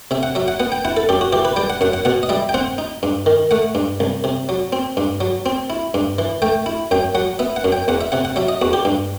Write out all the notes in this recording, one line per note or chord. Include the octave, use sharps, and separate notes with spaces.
C3 E5
F#5
F#3 E5
F#5
B3 F#5
G5
E4 F#5
A4
F#2 G4
F#4
E3 G4
B4
G3 G5
F#5
F#2 F#5
F#5
B2 F#5
D#5
G3 E5
G5
C4 F#5
D#4
G2
D#3
A3 F#5
G2
C2
C3
F#3
C4
G2
F#3
C4
E4
G2
E3
A3 G5
E4
F#2 G5
F#3 F#5
B3 E5
F#5
F#2
G5
E2 F#5
E5
C3 F#5
F#5
F#3 E5
D#5
E2 F#4
G4
G2